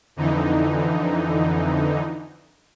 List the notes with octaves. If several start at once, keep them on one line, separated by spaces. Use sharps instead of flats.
F2 D3 E3 D#4